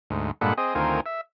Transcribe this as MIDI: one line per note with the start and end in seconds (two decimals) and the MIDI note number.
0.10 0.31 38
0.10 0.31 44
0.41 0.53 43
0.41 0.53 46
0.41 0.53 56
0.41 0.53 69
0.41 0.53 78
0.41 0.53 83
0.58 0.74 60
0.58 0.74 68
0.58 0.74 75
0.75 1.00 38
0.75 1.00 51
0.75 1.00 60
0.75 1.00 65
0.75 1.00 70
0.75 1.00 80
1.06 1.21 76